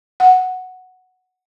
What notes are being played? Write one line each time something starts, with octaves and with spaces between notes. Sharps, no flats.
F#5